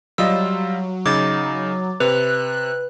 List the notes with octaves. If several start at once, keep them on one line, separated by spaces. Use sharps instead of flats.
F#3 G3 F4 D#5 E6
C#3 D#4 D6 G#6 A6
C3 B4 F#6